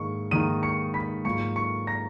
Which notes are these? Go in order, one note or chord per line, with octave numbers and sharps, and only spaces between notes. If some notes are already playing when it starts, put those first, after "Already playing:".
Already playing: G#2 D#3 A#3 C#6
G#2 D#3 A#3 D#4 D#6 D#7
C#6 C#7
B5 B6
G#2 F#3 A#3 F4 C#6 C#7
C#6 C#7
A#5 A#6